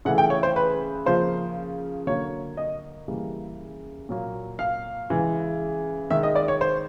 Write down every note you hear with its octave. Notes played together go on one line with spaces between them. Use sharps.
C#3 E3 A3 F#5
G5
C#5
C5
B4
C#3 F3 A#3 C5
D3 F#3 A#3 C#5
D#5
C#3 E3 G3 A#3
A#2 F#3 A#3
F5
C#3 E3 G#3
D#3 G#3 E5
D#5
D5
C#5
C5